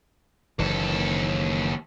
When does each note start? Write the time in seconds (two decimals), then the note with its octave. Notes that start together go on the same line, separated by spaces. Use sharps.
0.59 F#1 D#2 E3 A4